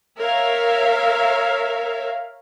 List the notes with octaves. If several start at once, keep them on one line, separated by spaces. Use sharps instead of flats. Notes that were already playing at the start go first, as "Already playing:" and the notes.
A#4 C#5 E5 F5